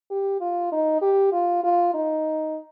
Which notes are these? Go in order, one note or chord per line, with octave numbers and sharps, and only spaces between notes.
G4
F4
D#4
G4
F4
F4
D#4